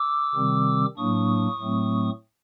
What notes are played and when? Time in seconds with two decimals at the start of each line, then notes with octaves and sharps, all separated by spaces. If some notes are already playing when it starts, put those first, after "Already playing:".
Already playing: D6 E6
0.34 C3 D#3 G3 C4
0.97 A2 F#3 A#3 D4 C#6 D#6
1.60 A2 F#3 A3 C4